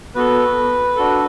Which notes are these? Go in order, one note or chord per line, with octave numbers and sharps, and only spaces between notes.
B3 F#4 A4 B4
D4 F#4 A4